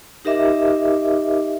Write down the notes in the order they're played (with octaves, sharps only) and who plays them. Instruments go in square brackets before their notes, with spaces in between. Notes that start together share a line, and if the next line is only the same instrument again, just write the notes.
[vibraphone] D#4 G4 A#4 D#5 E5 D6